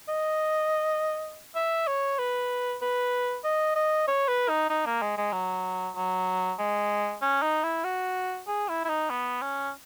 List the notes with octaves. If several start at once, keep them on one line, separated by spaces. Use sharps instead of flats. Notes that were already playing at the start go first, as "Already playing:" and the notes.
D#5
E5
C#5
B4
B4
D#5
D#5
C#5
B4
D#4
D#4
A#3
G#3
G#3
F#3
F#3
G#3
C#4
D#4
E4
F#4
G#4
E4
E4
D#4
B3
C#4